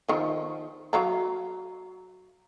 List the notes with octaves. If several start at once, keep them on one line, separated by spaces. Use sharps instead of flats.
D#3 F3
F#3 F5 A#5